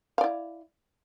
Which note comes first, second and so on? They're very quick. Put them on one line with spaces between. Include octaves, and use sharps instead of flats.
F5 D5 E4